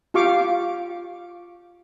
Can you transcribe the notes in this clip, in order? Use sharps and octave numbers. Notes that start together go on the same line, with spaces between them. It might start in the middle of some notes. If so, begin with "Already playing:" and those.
F4 G4 F5 C#6 D6